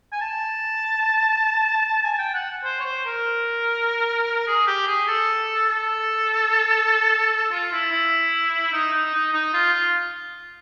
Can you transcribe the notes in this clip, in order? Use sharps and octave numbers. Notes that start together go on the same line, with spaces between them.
G#5
A5
G#5
G5
F#5
C5
C#5
C5
A#4
G#4
G4
G#4
A4
A4
F4
E4
E4
D#4
D#4
D#4
D#4
F4
F4